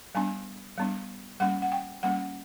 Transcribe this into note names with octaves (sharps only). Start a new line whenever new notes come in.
G3 B3 D4 G#5
G3 B3 D4
G3 A#3 C#4 F#5
F#5
G5
G3 A#3 C#4 F#5